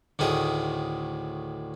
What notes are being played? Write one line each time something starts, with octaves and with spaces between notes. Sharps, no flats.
D2 A2 D#3 G#4